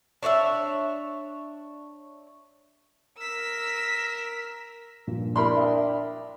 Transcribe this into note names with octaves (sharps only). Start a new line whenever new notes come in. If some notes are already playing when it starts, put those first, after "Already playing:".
D4 C#5 D5 E5
A#4 E6 B6
G2 A#2 F3
D4 A#4 B5 C6
E5 G5 D#6